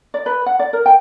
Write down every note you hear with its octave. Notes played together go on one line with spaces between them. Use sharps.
D5
B4
F#5
D5
A#4
G5